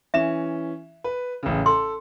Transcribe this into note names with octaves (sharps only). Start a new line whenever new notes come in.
E3 C#4 E5 E7
B4
A1 C#3
A4 C6